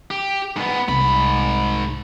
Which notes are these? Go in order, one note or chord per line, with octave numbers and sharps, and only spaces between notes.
G4
G#2 B3
C2 G#2 B5